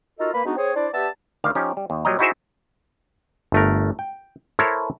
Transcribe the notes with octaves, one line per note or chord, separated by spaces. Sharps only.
D#4 F4 F#4 A4 A#4 D#5
A#3 B4 B5
G#3 B3 D4 D#4 F#4
C4 G#4 C5 C#5
D4 E4 C5 D5
B3 G4 D5 E5 A5
D2 D#3 D5 F5
F3 C#4 D#4 G4
G3
D#2
A#2 F#3 G3 D#5 A#5
D#4 E4 F#4 G#4 C5 E5
G1 A3 A#4
G5
E4 A4 A#4 C5 C#5